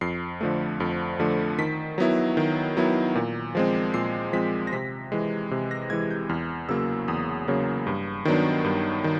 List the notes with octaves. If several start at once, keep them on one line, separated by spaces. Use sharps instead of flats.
F2 C7
D3 F3 A3
F2
D3 F3 A3
D#3 B6
F#3 B3 E4
D#3
F#3 B3 E4
A#2
F3 G#3 C4
A#2 C7
F3 G#3 C4 B6
A#6
C3 B6
E3 G#3
C3
A#6
E3 G#3 G#6
G6
E2 F6
C#3 F#3 A#3 E6
E2 D#6
C#3 F#3 A#3
G2
D#3 F#3 B3 D4
G2
D#3